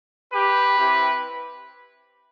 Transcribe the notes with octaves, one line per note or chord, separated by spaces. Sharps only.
G4 B4
C4 E4 G4